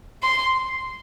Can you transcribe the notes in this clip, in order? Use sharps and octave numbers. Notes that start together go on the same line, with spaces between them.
C6